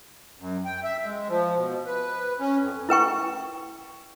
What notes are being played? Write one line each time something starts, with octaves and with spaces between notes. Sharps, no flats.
F#2
G5
E5
G#3
F3
B2
B4
C#4
F2
E4 B4 G5 C#6